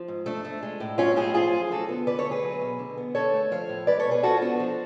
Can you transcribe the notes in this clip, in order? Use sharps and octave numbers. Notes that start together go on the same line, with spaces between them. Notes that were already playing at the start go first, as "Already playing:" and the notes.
Already playing: F3
G#2
A3 D4
A3
G#3
A2
F#3 C#4 F4
A2 F4 G#4
F3 F4 G#4
F#2
D3 F#4 A4
B3
D3 B4 D5
A4 C#5
A3
G#4 B4
F#3
B2
D3
B3
D3 A4 C#5
A3
F3 C#5 F5
A2
G#3 B4 D5
A4 C#5
B2
G#4 B4
F3 F#4 A4
B3 D4 F#4
F3